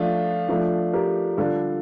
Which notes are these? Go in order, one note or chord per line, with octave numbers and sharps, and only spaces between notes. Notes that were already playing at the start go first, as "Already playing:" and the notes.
Already playing: F3 A3 D4 F4
F3 A3 D4
G4 A#4
D3 G3 D4 F4 A4